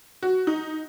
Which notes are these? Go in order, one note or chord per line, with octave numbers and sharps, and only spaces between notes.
F#4
D#4